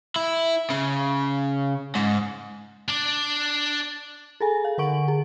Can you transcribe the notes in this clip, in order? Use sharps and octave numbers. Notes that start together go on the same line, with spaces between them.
E4
C#3
G#2
D4 D5
G#4 A4 G#5
F5
D3 A#4 F#5 C#6 D7 F#7
G#4